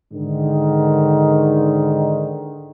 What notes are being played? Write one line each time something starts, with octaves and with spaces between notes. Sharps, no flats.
G#2 D3 D#3